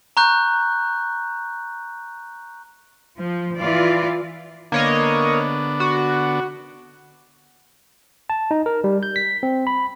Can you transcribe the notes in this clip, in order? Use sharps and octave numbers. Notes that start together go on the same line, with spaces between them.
A#5 C#6 F#6 G6
F3
E3 F4 D5
D3 A#3 B3 D4 C#5 D#5
F#4
A5
D#4
A#4
G3
G6
B6
C4
B5